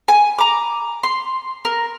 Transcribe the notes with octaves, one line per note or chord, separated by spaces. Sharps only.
G#5
A#5 D6
C6
A#4